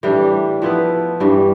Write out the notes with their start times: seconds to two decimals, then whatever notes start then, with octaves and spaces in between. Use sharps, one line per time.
0.03 A2 E3 G3 D4
0.62 F3 B3 E4 B4
1.20 G2 E3 G3